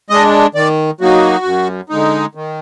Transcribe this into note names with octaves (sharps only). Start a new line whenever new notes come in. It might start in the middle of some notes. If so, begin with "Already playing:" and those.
G#3 D4 D#5
D#3 D5
F#3 A#3 D#4 F#4
F#2
D3 G#3 D#4
D#3